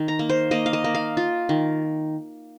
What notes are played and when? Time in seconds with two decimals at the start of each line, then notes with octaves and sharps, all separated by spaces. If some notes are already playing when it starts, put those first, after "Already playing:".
Already playing: D#3
0.08 A#5
0.19 A#3
0.30 C5
0.51 A#3 D#5
0.66 F5
0.73 D#5
0.84 A#3
0.95 F5
1.17 F4
1.49 D#3